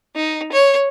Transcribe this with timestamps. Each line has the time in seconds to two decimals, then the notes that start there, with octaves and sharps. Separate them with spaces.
0.16 D#4
0.52 C#5